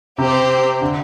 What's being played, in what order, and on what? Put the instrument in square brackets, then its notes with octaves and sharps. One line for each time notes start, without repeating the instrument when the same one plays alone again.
[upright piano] C3 [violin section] C4 G4 C5
[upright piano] D3